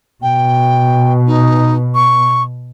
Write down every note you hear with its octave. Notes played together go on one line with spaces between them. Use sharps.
B2 G5
D#4
C#6